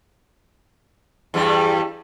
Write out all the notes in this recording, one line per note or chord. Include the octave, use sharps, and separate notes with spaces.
E2 G2 G3